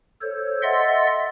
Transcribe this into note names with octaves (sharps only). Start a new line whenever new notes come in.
A4 C5 C#5
D#5 E5 F#5 C6 E6 A6